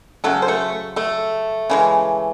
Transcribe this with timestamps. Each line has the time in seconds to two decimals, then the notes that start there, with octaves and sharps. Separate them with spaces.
0.24 C#3 F#3 A3 A4
0.42 C5
0.48 A3 A4
0.96 A3 A4
1.70 C#3 E3 G#3